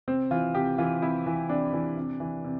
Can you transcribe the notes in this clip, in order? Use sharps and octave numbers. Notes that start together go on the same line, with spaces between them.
C3 C4
E3 F4
C3 G4
E3 F4
C3 E4
E3
C3 D4
E3
C3
E3
C3